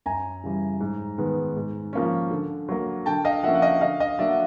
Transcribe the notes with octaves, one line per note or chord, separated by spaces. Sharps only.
F#2 G#5 A#5
C#3 E3 G3
G#2
D#3 G#3 B3
G#2
F3 A#3 C#4
D3
F#3 A#3
D3 G5 A5
D#5 F5
F3 A#3 C#4 E5 F#5
F#5
D#5 F5
D3 D#5 F5
D#5 F5
F#3 A#3 D4 D5 E5
F#5